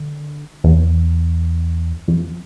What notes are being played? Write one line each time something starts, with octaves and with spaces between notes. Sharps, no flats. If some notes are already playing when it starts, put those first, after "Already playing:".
Already playing: D3
E2
F2